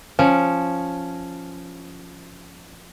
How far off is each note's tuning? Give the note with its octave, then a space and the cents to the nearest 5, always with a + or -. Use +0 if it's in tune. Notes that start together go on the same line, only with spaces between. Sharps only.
F3 +0 C#4 +0